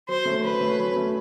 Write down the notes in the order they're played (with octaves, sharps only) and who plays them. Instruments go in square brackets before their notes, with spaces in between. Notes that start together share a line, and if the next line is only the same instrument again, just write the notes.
[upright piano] F#3 [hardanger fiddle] C5
[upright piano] A3 C#4
[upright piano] F#3 [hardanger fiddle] B4
[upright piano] A3 C#4
F#3
A3 C#4